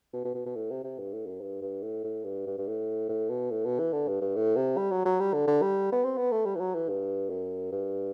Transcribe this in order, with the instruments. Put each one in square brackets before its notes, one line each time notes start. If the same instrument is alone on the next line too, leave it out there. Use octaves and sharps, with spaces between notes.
[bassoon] B2
B2
B2
B2
A2
C3
C3
G2
A2
F#2
G2
G2
A2
A2
G2
G2
G2
A2
A2
B2
A2
B2
E3
D3
G2
G2
A2
C3
G3
F#3
F#3
G3
D3
D3
G3
B3
C4
B3
A3
G3
E3
F#3
E3
G2
F#2
G2